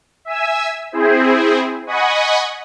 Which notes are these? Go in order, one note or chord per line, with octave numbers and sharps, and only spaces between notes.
E5 G#5 E6
C4 E4 G#4 C5
D#5 F#5 G#5 B5 C#6 D#6